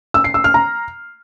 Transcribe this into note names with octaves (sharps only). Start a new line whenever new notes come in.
E6
C7
E6
F6
A#5